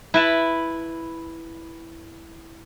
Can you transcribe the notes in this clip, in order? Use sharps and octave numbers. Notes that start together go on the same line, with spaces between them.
E4 B4 A5